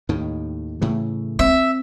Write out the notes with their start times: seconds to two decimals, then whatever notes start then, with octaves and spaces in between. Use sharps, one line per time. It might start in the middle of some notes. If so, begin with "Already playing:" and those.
0.09 D#2 A2 D#3
0.81 A2 C#3 E3
1.39 C4 E5